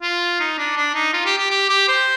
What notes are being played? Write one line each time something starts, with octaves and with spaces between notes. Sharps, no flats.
F4
D#4
D4
D4
D#4
F4
G4
G4
G4
G4
C5